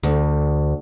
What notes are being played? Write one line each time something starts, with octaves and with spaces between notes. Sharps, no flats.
D2